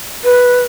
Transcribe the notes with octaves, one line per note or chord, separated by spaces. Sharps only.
B4